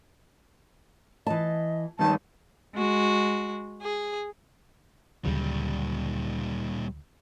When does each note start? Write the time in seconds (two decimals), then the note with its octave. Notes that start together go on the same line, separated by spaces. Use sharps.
1.27 E3 D#5 A5
1.99 G2 D#3 D#4 A5
2.74 G#3 F#4
3.82 G#4
5.25 D2 A#2 C#3 F#3 G3